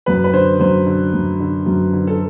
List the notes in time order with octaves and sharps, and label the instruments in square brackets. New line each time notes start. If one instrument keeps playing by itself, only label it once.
[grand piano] F#2 B4
B4
D3 C5
F#2 C5
D3
F#2
D3
F#2
D3
A4